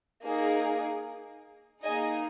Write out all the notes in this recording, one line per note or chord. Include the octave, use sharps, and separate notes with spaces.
A#3 D#4 G#4
A#3 D#4 G#4 D#5 G#5